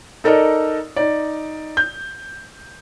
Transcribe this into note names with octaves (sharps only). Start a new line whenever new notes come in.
D#4 A4 A#4 D5 D#5
D#4 D5
G6